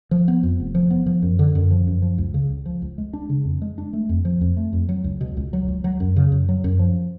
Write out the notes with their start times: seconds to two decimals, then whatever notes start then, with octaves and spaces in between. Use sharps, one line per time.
0.11 F3
0.28 B3
0.43 F2
0.60 F1
0.75 F3
0.90 B3
1.06 F3
1.22 F#2
1.39 D3
1.55 F#2
1.71 F3
1.87 F#2
2.02 F3
2.18 C#2
2.34 C#3
2.50 C#2
2.66 F3
2.82 C#2
2.98 G#3
3.13 D4
3.29 C#3
3.45 F2
3.62 G#3
3.78 D4
3.93 A3
4.09 F2
4.25 F3
4.41 F2
4.57 A3
4.73 F2
4.89 F#3
5.04 C#2
5.21 B2
5.37 C#2
5.53 F#3
5.68 C#2
5.84 F#3
6.00 F#2
6.16 C#3
6.32 F#2
6.49 F#3
6.64 F#2
6.79 F3